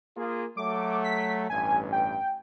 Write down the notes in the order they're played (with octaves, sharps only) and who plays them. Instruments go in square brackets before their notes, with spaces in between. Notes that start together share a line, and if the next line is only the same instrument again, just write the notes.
[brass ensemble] A#3 F4 G#4
[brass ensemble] F#3 A3 [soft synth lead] D6
[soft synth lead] B6
[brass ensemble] A1 G2 [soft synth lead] G#5
[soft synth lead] G5